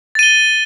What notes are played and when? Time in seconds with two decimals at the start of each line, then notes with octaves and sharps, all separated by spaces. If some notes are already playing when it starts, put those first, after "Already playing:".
0.15 A6
0.19 D#7
0.23 G7